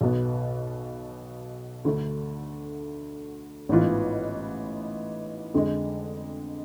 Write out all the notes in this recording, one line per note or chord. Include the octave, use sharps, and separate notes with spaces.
B1 B2 B3
D2 D3 A3
A1 G#2 E3 B3 F4
F2 D3 G#3